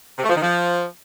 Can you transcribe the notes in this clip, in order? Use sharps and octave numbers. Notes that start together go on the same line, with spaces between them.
C3
A3
F3
D#3
F3